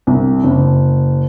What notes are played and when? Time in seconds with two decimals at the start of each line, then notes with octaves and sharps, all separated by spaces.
0.07 C2
0.44 F#1